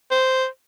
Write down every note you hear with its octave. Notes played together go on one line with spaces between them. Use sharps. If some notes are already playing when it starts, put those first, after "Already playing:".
C5